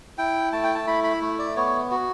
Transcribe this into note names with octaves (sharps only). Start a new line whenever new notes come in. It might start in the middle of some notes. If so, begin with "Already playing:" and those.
E4 G5
A3 A5
G5
A5
E4 B5
B5
A3
D5
B3 C#5
F#4